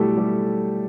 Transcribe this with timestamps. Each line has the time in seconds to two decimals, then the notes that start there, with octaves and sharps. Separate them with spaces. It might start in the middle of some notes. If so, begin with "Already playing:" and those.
Already playing: B2 F#3 G3 A3 E4 G4 A4
0.17 G3 G4